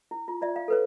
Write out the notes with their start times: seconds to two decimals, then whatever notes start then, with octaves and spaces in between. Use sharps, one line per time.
0.11 E4
0.28 F4
0.41 F4 D5 E5
0.56 F5
0.68 A4 B4 C#5